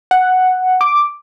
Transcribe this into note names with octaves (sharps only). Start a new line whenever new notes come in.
F#5
D6